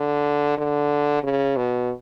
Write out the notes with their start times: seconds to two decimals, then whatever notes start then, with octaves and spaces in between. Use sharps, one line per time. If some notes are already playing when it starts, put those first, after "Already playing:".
Already playing: D3
0.58 D3
1.23 C#3
1.56 B2